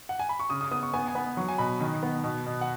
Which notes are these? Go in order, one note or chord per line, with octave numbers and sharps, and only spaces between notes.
F#5
G#5
B5
C#6
C#3 D#6
D#6
B3 D#6
C#6
B3 G#5
G#5
B3 B5
F#3 C#6
G#5
B2 B5
D#3
B3
B2
B2
F#5